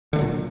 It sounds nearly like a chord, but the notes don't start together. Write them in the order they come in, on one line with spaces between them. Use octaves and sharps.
D3 A3 F#3 A#2